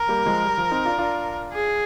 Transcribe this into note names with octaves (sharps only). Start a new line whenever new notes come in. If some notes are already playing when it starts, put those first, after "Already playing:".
Already playing: A#4
G3 A#3
F3 G#3
G3
F3
C4 D#4
D4 F4
D4 F4
G#4